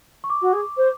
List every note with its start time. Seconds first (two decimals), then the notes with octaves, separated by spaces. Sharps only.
0.24 C#6
0.30 D6
0.41 F#4
0.52 G#4
0.77 C5